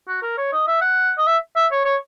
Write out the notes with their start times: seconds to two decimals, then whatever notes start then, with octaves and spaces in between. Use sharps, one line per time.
0.08 F#4
0.23 A#4
0.38 C#5
0.53 D#5
0.68 E5
0.81 F#5
1.18 D#5
1.27 E5
1.56 E5
1.72 C#5
1.85 C#5